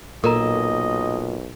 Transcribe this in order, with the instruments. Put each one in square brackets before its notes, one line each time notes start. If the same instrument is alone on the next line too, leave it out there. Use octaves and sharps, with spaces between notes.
[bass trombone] B1 [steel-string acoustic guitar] A#2 [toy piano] A4 A#4 A#5 [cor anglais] D#5